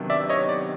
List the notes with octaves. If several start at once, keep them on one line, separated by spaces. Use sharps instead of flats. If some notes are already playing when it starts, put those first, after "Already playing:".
Already playing: C3 D#3 F#3 B3 D4
D5 E5
C#5 D#5
D5